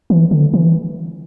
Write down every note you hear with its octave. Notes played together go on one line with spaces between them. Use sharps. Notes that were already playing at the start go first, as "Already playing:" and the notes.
E3
D3
E3